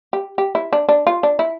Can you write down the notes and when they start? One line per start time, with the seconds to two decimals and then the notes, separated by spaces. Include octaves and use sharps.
0.13 G4
0.38 G4
0.55 E4
0.73 D4
0.89 D4
1.07 F4
1.23 D4
1.39 E4